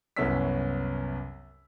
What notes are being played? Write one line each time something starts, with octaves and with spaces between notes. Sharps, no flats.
C2 F#2 B3 C#4 E6 B6